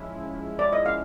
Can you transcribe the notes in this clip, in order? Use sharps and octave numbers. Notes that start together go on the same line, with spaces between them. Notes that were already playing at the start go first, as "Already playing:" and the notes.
Already playing: F3 G#3 C#4 E4
D5
D#5
F5